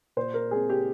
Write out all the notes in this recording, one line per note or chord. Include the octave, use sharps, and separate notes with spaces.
A#2 C5
A#4
G#3 C4 G#4
G4